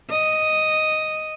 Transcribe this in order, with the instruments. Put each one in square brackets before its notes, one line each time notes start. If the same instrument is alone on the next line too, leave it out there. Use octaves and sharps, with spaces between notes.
[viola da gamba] D#5